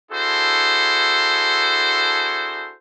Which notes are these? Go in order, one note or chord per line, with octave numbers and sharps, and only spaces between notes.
D4 E4 F#4 G#4 A4 C5